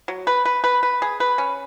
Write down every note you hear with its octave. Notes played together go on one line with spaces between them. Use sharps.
F#3
B4
B4
B4
B4
G#4
B4
C#4